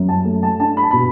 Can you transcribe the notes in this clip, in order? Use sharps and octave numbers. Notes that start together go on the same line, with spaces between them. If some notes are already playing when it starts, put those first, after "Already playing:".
Already playing: F#2
A5
A3
A5
D4 A5
B5
A5
B2 B5